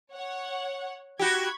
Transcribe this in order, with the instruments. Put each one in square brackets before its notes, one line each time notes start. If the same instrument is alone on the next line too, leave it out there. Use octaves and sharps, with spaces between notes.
[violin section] C#5 F#5
[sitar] F#4 G4 [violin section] B5 C#6 G#6